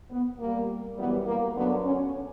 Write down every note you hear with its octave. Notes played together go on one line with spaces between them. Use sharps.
B3
A#2 G3 A#3
F#2 E3 G3 B3
A#3
F#2 D3 F#3 B3
C#4